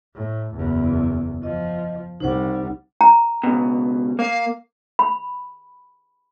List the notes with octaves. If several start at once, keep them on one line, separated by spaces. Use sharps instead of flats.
A2
F#1 E2
F3 D#5
C2 G3 D#4 C5 F#5
A#5
C#2 B2
A#3 F5
B5